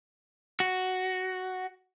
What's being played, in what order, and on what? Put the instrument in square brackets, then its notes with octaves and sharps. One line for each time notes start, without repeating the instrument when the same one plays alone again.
[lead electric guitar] F#4